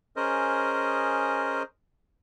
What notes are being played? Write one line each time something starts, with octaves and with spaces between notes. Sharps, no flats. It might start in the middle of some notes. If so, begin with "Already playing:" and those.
C#4 G#4 A#4 C5 D#5